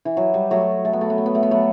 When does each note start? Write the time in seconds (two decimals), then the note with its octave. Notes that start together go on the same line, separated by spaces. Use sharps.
0.05 E3
0.17 F#3
0.34 G3
0.50 F#3 A3
0.85 A3
0.93 B3
1.01 A3
1.10 B3
1.18 A3
1.26 B3
1.35 A3
1.43 B3
1.51 F#3 A3